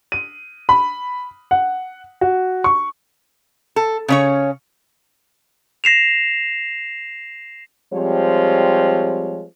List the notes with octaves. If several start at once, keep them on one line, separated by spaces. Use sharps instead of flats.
D#7
B5
F#5
F#4
C#6
A4
C#3 C#4 C#5
A#6 C7 E7 F7
F3 G3 G#3 C4 C#5